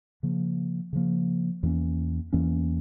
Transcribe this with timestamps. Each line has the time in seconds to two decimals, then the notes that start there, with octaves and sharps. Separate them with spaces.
0.23 C#3 F3 A#3
0.93 C#3 F3 A#3
1.63 E2 E3 A#3 C#4
2.33 E2 E3 A#3 C#4